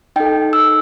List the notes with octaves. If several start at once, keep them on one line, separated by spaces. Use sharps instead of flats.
D#4 A4 G5
E6